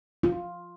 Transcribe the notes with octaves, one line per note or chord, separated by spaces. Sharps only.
F4